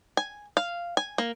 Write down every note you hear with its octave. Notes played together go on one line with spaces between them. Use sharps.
G#5
F5
G#5
A#3